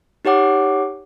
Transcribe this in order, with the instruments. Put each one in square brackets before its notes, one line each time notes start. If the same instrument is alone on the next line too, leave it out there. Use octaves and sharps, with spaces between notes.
[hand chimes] D#4 G4 C#5 F#5 D6